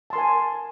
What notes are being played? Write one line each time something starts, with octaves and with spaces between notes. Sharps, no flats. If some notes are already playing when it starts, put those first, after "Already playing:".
A#4 G#5 A5 C6